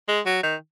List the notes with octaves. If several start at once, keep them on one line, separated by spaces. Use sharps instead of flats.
G#3
F#3
D#3